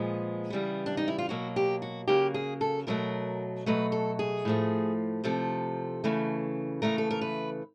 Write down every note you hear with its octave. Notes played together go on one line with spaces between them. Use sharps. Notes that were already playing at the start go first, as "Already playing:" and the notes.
Already playing: A#2 F3 G#3 B3 G#4
C#3 E3 G3 B3
D4
D#4
E4
F4
B2 F#3 A#3 F#4
G4
F#4
C#3 F#3 A#3 G4
G#4
A4
B2 F#3 A3 A#4
B2 F#3 A3 B4
A4
G#4
A2 F3 A3
C3 F3 A3 A4
C#3 E3 A3
C#3 E3 A3 A#4
A4
A#4
B4